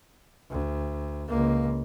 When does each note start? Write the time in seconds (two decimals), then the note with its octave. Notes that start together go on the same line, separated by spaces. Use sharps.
0.51 D2
1.28 C#2 A#3